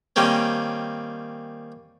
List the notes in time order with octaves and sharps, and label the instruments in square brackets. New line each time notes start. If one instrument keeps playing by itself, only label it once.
[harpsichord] D#3 G3 A#3 C4 C#4